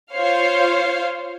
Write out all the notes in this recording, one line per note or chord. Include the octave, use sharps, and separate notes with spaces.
F4 C5 C#5 F5